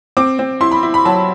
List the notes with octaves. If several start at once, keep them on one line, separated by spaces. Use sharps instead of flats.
C4 D6
C4
E4 C6
B5
E4
B5
F#3 A5